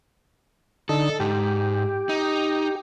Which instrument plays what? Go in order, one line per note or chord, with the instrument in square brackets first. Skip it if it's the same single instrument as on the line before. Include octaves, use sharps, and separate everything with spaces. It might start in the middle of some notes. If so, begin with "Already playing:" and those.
[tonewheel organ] D3 D#4 [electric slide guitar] A4
[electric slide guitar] G#2 [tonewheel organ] G4
[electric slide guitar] D#4